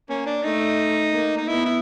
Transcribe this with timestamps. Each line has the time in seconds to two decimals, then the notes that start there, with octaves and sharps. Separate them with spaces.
0.09 A#3 C#4
0.26 D4
0.43 A3 D#4
1.13 A#3
1.38 D#4
1.47 B3 E4
1.66 E4